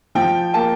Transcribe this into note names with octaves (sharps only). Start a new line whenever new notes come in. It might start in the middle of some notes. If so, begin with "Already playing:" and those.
F3 G5
A#3 A5